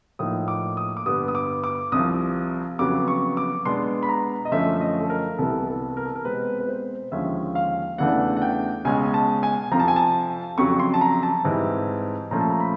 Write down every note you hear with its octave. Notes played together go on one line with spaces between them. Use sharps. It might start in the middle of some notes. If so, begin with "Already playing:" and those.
A2 F3 A#3 D#4 D#6
D6
D#6
D6
G2 D3 G3 B3 D#6
D#6
D6
D6
C2 C3 F3 D#6
F2 C#3 F#3 B3 D6
C#6
D6
B2 G#3 B3 D4 C6
B5
A#5
D#5
F#2 D3 F3 A3 C#4 E5
E5
D#5
A4
A#4
C2 C3 E3 G3 B3 A4
A4
A#4
A4
A#4
B2 G#3 C4 B4
B4
C5
D#2 D3 F3 G#3 C#4 E5
F5
E2 C#3 E3 A3 D4 F#5
F#5
G5
C#2 B2 G#3 C#4 G#5
A5
G#5
F2 C3 F3 A#5
A5
G#5
A5
F2 C#3 F#3 C#6
C6
A5
A#5
A5
G#2 E3 G3 C4
A#2 F3 A3 C#4 A#5
A5
A#5
B5